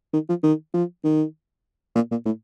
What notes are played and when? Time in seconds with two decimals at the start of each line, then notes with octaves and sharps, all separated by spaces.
0.14 D#3
0.29 F3
0.43 D#3
0.74 F3
1.04 D#3
1.96 A#2
2.11 A#2
2.26 A2